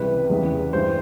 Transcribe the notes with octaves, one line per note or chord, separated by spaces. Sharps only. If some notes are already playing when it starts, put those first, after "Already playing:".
Already playing: C#2 C3 E3 G3 B4
E2 C#3 E3 G3 B3
G2 E3 G3 C5